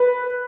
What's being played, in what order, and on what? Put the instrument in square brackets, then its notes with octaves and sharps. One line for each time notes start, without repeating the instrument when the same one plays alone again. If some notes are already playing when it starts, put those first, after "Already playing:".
Already playing: [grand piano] B4